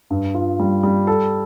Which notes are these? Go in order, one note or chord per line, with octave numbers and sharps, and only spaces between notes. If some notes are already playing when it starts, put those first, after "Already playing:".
G2
F4
G3
G3
A4